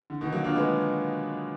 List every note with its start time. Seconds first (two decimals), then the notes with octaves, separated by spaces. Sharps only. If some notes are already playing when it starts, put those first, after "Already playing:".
0.10 D3
0.21 B2 D#3
0.32 F#3 A#3
0.44 D4 F4
0.56 G#3 B3